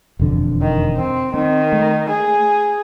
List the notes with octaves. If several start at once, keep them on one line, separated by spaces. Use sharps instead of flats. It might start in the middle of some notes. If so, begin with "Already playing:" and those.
E1 F2 D3
D#3
C4
D#3 C4
A3
G#4